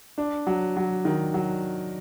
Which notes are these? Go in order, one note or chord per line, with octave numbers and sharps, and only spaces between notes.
D4
F#3
F#3
D#3
F#3